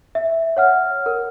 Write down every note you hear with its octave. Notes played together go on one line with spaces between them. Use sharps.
E5
C#5 F#5 F6
A#4